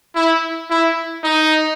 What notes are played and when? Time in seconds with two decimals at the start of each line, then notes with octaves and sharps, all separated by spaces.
0.16 E4
0.70 E4
1.23 D#4